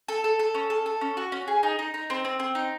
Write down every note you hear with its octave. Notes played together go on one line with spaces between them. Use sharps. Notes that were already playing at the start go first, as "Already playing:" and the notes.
A4
A4
A4
C#4
A4
A4
C#4
F#4
C#4
G#4
D#4
D#4
D#4
C4
C4
C4
D#4